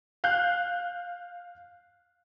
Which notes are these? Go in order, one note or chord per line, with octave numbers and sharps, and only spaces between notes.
F5 F#6 G6